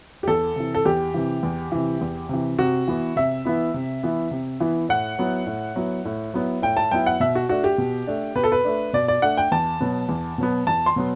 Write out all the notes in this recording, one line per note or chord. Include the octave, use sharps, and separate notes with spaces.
G4
E2 A4
C3 E3
A4
E2 G4
C3 E3
E2
C3 E3
E2
C3 E3
C3 F#4
E3 B3 E4
C3 E5
E3 B3 E4
C3
E3 B3 E4
C3
E3 B3 E4
A2 F#5
F#3 B3 E4
A2
F#3 B3 E4
A2
F#3 B3 E4
A2 G5
A5
F#3 B3 E4 G5
F#5
B2 E5
F#4
A3 D4 F#4
G4
B2
A3 D4
B2 B4
A4
B4
A3 D4
B2 D5
D5
A3 D4 F#5
G5
E2 A5
B2 F#3 B3
E2
B2 F#3 B3
E2 A5
C6
B2 F#3 B3